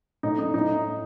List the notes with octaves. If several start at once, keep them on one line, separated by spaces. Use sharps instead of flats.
A2 D#4
D#4
A2 D#4